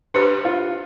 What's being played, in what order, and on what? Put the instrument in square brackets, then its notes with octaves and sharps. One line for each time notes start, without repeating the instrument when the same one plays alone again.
[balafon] D4 G4 C5 [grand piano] B4
[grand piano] F4